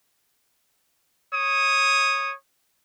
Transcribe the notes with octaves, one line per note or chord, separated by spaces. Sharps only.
C#5 D#6